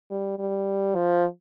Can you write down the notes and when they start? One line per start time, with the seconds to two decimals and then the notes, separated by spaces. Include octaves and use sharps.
0.11 G3
0.39 G3
0.95 F3